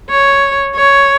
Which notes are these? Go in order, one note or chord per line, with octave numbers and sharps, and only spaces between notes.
C#5
C#5